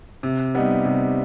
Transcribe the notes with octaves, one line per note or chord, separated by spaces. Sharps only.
C3
G3 B3 D#4
C3